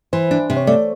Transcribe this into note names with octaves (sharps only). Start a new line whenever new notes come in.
E3 C5
D4
C3
C#5
A3 D5